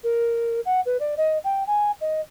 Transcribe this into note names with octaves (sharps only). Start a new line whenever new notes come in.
A#4
F#5
B4
D5
D#5
G5
G#5
D#5